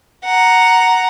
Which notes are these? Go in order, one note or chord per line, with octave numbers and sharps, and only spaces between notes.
F#5 A#5